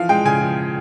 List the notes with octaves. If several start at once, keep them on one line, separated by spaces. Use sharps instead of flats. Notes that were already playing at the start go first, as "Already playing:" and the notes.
Already playing: E3 F3 F5
G#3 G5
C#3 G#5
F3